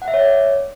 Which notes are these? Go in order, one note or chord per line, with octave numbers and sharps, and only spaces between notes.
F#5
E5
C#5
D5